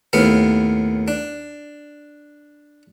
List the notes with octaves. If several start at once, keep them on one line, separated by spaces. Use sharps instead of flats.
D#2 A2 B3 F5
D4